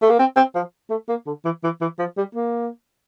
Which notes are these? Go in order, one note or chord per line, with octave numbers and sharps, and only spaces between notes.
A3
A#3
C4
C4
F3
A3
A#3
D3
E3
E3
E3
F3
G3
A#3